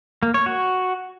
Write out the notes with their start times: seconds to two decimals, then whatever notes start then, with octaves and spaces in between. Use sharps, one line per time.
0.23 A#3
0.34 C#5
0.46 F#4